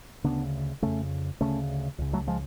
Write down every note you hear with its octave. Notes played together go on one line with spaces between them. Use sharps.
D2 C#3 B3 D4
F2 C#3 A3 C#4
D2 C#3 A3 C#4
C#2 C#3
F#3 A3
F3 G#3